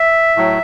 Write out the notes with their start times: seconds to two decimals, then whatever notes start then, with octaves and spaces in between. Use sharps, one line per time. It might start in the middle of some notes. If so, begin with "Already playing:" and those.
Already playing: E5
0.36 A2 F#3